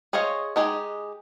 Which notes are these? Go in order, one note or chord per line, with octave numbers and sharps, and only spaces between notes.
G#4 C5 C#5 D#5 F5
G#3 D#4 G4 G#4